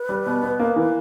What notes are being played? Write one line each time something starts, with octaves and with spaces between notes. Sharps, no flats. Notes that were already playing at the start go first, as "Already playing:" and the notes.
Already playing: B4
G3
B2
B3
A#3
E3